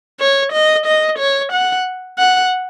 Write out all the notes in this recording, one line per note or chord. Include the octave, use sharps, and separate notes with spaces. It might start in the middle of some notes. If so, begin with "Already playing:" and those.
C#5
D#5
D#5
C#5
F#5
F#5